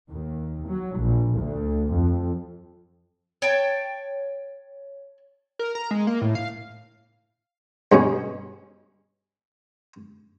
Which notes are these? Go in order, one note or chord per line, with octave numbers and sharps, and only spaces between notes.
D#2
F#3
A#1
D2
F2
C#5 G5 A5
A#4
A#5
G#3
A#3
A2
F5
G2 B2 C#4